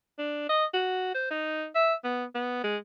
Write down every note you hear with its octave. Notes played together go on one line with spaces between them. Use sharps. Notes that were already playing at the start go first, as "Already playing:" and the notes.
D4
D#5
F#4
C5
D#4
E5
B3
B3
G#3